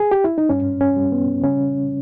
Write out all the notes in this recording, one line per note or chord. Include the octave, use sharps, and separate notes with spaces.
G#4
G4
E4
D#4
G2 C#4
C#4
G3
B3
C#3 C#4